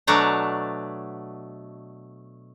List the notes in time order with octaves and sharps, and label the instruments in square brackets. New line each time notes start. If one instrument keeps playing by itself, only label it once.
[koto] B2 F#3 A3 D4 A5 A#5